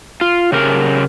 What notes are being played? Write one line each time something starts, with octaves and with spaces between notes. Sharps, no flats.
F4
C#3 G4 A#4